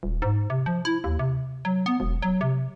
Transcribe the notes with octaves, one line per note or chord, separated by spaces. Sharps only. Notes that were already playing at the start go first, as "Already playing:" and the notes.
D#1
G#2
C3
F3
E4
D#2
C3
F#3
B3
E1
F#3
C3